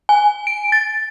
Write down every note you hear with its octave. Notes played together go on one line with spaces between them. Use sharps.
G#5
D7
A6